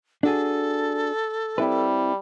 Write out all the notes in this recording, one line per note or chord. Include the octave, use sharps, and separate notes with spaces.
D4 F#4 G#4 A4
G3 C4 E4 B4